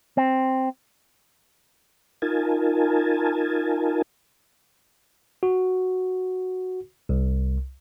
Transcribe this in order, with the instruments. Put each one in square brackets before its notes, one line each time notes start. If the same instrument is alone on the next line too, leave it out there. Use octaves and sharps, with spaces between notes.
[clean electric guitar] C4
[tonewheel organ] D#4 F4 A#4 G#5 A5
[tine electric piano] F#4
C2